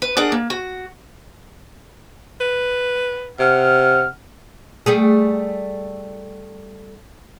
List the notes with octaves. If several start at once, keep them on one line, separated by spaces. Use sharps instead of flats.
B4
D4 G#4 A#4 D5 F#5
A#3
F#4
B4
C3 F#5 F6
G3 A3 G#4